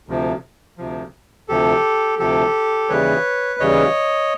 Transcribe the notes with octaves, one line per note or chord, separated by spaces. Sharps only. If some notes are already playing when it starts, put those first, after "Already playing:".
D2 C3 F3
D2 C3 F3
D2 C3 F3 G4 A4
D2 C3 F3 G4 A4
D#2 C#3 E3 G3 B4 C#5
D#2 C#3 E3 G3 C#5 D#5